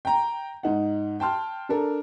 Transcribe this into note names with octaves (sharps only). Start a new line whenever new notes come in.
G5 A#5
G#2 D#4 F#5
G5 A5 C6 F6
D4 A4 A#4